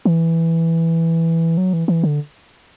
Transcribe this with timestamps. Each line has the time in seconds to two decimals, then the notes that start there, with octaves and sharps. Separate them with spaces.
0.05 E3
1.57 F#3
1.73 E3
1.88 E3
2.03 D3